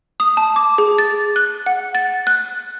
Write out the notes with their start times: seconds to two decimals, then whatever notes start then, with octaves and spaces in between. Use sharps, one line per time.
0.20 D#6
0.37 A5
0.56 D6
0.78 G#4
0.98 A6
1.36 F#6
1.66 F#5
1.95 A6
2.27 F#6